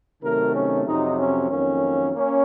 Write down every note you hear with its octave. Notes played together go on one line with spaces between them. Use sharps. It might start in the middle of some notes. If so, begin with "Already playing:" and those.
C3 D#3 F#3 A3 A#4
C#4
F2 C3 F#3 D#4
C#4
F2 D#3 F#3 A#3 C#4
A#3 C#4